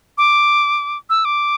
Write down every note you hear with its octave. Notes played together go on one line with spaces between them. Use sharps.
D6
E6
D6